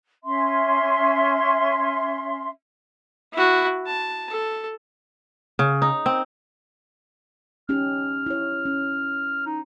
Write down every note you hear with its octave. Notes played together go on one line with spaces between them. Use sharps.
C#4 E5 C6
E4 F#4
A5
A4
C#3
D#4
C4
C#4 D#4 G4 F6
E4 C#5
C#4
D#4